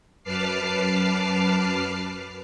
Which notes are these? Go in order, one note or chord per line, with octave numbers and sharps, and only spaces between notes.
F#2 B4 A5 D6 F6 C7